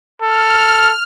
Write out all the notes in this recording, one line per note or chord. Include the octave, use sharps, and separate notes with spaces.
A4 F6